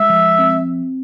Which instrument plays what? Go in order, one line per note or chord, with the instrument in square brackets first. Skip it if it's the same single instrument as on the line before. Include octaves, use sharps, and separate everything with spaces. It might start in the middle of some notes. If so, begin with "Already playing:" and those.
Already playing: [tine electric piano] G#3 [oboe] E5
[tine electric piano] F3
C4